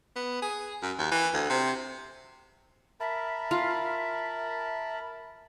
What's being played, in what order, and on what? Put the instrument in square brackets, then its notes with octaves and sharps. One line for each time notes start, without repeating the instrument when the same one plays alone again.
[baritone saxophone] B3
G#4
F#2
D#2
E3
D2
C3
[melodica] A#4 A5 B5 [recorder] E5
[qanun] F4 F5